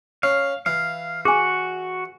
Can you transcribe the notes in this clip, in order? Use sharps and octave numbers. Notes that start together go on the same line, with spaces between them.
C#4 F5
E3 F5
F#4 G#4 G#5